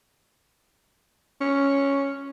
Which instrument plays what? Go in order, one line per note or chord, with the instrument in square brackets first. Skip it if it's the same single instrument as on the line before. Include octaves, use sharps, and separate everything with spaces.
[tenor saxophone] C#4